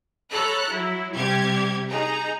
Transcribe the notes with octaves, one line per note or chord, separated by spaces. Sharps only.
A4 C#5 A#5 B5 F#6
F#3 E4
C3 G3 G4 G#6
D#4 G#4 A#5